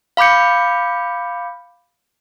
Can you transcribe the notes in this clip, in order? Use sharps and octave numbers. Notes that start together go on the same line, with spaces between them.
F5 B5 D6 G6 C#7